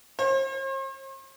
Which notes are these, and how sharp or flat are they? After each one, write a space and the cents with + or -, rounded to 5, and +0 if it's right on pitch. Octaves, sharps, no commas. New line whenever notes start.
C5 +45